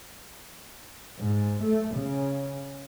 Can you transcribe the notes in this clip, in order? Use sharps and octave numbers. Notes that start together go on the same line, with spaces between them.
G#2
A3
C#3